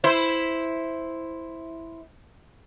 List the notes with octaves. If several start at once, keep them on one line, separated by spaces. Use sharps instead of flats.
E4 C5